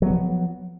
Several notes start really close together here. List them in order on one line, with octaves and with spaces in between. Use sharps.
F#3 B3 F3